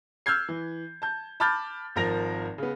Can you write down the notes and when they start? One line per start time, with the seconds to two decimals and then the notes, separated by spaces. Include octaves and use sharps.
0.26 E6 F6 G6 G#6 C7
0.48 E3
1.02 A5 G6
1.40 A5 B5 D6 F6 G6 A6
1.96 G#1 F3 A#4 A#6 F7
2.58 C#3 B3